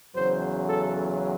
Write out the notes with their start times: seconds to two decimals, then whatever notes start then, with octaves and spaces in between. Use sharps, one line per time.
0.14 E2 C#3 F#3 C5
0.67 A4